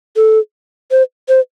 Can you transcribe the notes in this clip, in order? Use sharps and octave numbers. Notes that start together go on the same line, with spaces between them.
A4
C5
C5